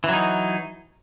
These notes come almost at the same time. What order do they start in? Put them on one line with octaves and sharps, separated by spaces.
E3 F#3 D#4